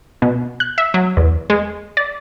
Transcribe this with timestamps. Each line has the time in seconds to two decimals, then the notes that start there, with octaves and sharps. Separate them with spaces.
0.22 B2
0.60 F#6
0.78 E5
0.94 F#3
1.17 E2
1.50 G#3
1.97 D5